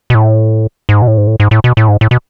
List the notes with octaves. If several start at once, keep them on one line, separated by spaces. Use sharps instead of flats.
B2
A2
G#2
B2
A2
G#2
A2
G#2
A2
B2
A2
G#2
A2
B2